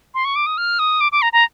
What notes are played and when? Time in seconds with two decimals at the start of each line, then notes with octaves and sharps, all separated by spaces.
0.14 C6
0.25 C#6
0.36 D6
0.46 D#6
0.58 F6
0.79 D#6
1.01 D6
1.12 D6
1.22 A#5
1.33 A#5